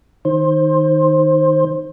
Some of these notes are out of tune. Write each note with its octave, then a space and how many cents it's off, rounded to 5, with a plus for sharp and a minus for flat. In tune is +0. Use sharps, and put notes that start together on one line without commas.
D#3 +0 C5 +20